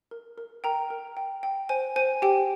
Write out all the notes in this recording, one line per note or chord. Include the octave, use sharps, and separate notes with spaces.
A#4
A#4
A#4 G5 A#5
A#4
G5
G5
C5 G#5
C5 G#5
G4 G5